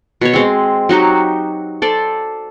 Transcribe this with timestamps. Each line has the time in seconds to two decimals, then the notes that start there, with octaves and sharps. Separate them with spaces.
0.21 B2 C#5
0.34 G#3 C4
0.89 F#3 D#4 F#4 G4
1.82 A4 C5 D5